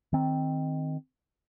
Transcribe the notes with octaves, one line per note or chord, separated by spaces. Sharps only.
D#3 C4